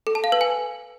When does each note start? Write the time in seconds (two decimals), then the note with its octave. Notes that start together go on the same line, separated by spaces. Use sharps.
0.07 A4
0.15 A5
0.24 F5
0.32 B4
0.41 G#5